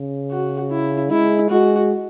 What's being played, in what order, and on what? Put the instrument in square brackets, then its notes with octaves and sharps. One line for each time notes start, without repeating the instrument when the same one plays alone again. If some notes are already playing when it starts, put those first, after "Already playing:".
Already playing: [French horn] C#3
[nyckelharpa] F#4
E4
[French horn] G#3 [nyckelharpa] E4
[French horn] G#3 [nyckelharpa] F#4